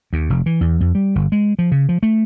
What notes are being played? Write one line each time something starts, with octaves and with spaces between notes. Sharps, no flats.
D#2
F1
E3
E2
F2
G3
G1
G#3
F3
C#3
F3
A3